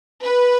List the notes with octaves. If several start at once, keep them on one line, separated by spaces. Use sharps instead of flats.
B4